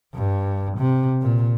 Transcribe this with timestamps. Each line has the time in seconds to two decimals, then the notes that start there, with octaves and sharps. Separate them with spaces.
0.15 G2
0.78 C3
1.21 A#2